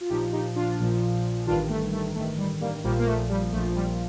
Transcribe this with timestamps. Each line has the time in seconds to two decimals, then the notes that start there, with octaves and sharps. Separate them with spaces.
0.01 F4
0.09 A#1 A#2 F3 D#4 G4
0.33 D#4 G4
0.55 D4 F4
0.78 A#1 A#2 F3
1.47 A1 G2 D#3 D4 F4
1.69 A3
1.92 A3
2.15 A1 G2 D#3 A3
2.38 G3
2.61 G3 A#3
2.83 A#1 A#2 F3 G3 A#3
2.99 A#3
3.06 A3
3.29 G3
3.52 A#1 A#2 F3 A3
3.75 G3